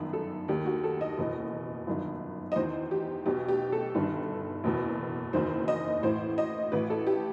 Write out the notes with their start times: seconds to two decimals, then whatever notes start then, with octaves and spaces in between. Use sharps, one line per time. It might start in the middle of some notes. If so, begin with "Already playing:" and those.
Already playing: G1 F#2 D#3
0.13 A4
0.48 D#2 D#3 G4
0.66 F#4
0.84 A4
1.01 D#5
1.18 F#1 E2 B2
1.87 G1 F#2 D#3
2.52 D#5
2.56 E2 D#3 C5
2.91 G4
3.26 B1 B2 G4
3.48 G4
3.72 A4
3.95 G1 G2 D#3
4.64 F#1 E2 B2
5.33 F#1 E2 D#3 C5
5.68 D#5
6.03 A1 A2 E3 C5
6.38 D#5
6.72 A1 A2 E3 B4
6.90 A4
7.07 G4